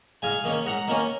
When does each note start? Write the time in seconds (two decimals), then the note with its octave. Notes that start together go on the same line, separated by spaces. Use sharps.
0.22 G#2 F5 G#5
0.44 D#3 A#3 C#4
0.66 G#2 F#5 A#5
0.88 D#3 A#3 C#4